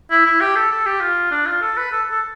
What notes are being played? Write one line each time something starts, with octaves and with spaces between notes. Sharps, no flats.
E4
E4
G4
A4
A4
G4
F4
D4
F4
A4
B4
A4
A4